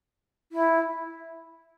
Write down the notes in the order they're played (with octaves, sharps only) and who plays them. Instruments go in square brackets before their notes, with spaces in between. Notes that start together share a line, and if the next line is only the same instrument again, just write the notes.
[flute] E4